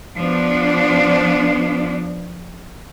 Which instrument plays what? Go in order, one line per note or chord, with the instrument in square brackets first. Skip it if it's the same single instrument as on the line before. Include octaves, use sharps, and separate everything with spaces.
[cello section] F3 B3 D4